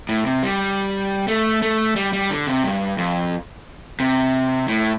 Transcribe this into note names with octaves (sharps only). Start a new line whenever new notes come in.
A2
C3
G3
A3
A3
G3
G3
D3
C3
G2
F2
C3
A2